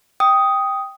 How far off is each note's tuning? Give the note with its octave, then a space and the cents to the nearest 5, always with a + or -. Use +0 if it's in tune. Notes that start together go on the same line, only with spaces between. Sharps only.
G5 +0 D#6 +5